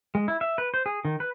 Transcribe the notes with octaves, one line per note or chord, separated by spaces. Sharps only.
G#3
E4
E5
B4
C5
G#4
D#3
B4